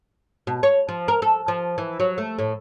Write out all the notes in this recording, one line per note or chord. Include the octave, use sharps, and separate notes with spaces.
B2
C#5
F3
A#4
A4
F3
E3
F#3
A3
A2